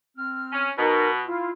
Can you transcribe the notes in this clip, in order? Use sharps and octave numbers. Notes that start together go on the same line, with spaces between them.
C4 F6
C#4
B2 D#4 A#4
E4 F4